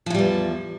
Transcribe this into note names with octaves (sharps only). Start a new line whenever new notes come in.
E2 A2 F3 G3